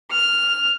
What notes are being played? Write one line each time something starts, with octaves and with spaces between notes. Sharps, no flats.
F6